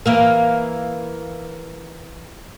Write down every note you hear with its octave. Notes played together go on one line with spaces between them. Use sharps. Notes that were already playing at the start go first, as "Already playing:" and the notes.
E3 A#3 A#4